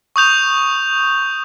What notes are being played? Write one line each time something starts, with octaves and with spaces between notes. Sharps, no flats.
C#6 D#6 G6 F7